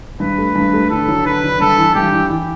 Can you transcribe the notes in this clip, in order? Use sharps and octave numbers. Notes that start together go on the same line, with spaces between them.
G2 B4
A3
G2
A3
D3 A4
F#3
D3 B4
D3
G2 A4
E3
G2 G4
E3
E3